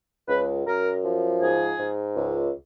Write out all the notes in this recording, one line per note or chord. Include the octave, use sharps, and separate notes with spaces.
C#2 B4
F#2 A#4
F3
G#2 G#4
G#2
C#2